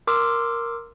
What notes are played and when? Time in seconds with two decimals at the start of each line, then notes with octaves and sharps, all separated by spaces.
0.07 A#4 C6 D6 E6